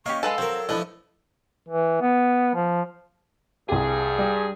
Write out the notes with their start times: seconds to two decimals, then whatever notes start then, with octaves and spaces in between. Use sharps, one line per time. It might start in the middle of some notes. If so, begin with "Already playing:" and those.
0.06 A#3 C#4 G4 D#5 C#6
0.23 G#3 A4 B4 F5 A5
0.38 F#3 C4 A#4
0.69 F3 A3 D4 E4 B4 D#5
1.69 E3
2.02 B3
2.55 F3
3.69 C2 G2 G4 G#4
4.18 G3